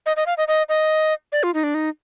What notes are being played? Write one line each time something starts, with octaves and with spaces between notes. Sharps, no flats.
D#5
D#5
F5
D#5
D#5
D#5
D5
F4
D#4
D4
D#4